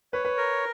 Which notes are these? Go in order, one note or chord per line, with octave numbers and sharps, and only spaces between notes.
B4 C#5
B4
A#4